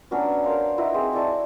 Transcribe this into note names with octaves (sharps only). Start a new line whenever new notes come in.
F#3 B3 C#4 D4
A#4 C5 F5
D#4 E4 F#4 B4
C4 G#4 C5
E4 A4 D5 C#6